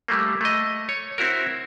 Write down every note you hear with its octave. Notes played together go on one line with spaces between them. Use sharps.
G3 A3 A#3
A3 D#5
C#5
C4 E4 F#4 A#4